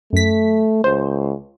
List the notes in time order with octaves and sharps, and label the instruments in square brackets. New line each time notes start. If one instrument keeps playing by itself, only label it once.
[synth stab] F#2 B6 [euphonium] A3
[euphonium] C#2 [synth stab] C5